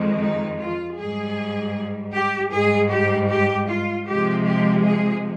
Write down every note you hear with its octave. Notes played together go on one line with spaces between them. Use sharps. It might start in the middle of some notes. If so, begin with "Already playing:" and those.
Already playing: F2 D#3 G#3
D#4
F4
G#2 G3 G#4
G4
G#2 G3 G#4
G4
G4
F4
C3 F3 G#3 G4
G4
G#4